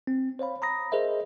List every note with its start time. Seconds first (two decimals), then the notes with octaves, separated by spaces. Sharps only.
0.07 C4
0.39 C5 C#5 F5 B5
0.62 A#5 B5 D#6 A#6
0.92 G#4 A#4 C5 D#5 E5